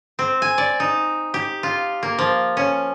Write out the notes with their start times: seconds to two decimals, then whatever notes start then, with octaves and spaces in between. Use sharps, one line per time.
0.19 C4
0.42 G#5
0.58 D5
0.80 D#4
1.34 G4
1.63 F4
2.03 A#3
2.18 F3
2.57 C#4